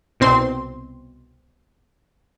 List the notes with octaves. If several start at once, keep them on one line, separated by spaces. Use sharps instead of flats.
C2 B2 C4 C6